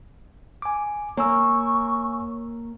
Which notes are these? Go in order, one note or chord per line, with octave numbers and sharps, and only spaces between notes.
G#5 D6
A#3 C#5 G#5 C#6 E6